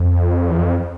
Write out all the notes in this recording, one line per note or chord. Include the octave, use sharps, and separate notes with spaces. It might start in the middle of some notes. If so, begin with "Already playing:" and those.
Already playing: F2
E2
F2